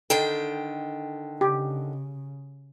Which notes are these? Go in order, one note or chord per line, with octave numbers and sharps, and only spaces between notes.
D3 D#3 A4 G5
C#3 G4